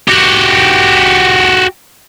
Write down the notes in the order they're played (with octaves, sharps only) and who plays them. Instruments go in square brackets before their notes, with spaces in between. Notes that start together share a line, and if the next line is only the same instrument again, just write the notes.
[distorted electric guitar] F#4 G4